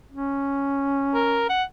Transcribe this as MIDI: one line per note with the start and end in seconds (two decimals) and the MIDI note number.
0.12 1.54 61
1.14 1.48 70
1.49 1.63 78